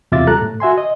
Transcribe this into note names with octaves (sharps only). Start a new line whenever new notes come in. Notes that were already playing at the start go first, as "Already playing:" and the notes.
E2 C3 F4 E5 D6 A6
G3 A4 A#5 F#6
A2 A3
F#4 E5 G#5 C6
D#5